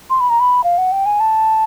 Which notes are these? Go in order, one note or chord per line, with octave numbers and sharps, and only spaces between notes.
C6
B5
A#5
B5
F5
F#5
G5
G#5
A5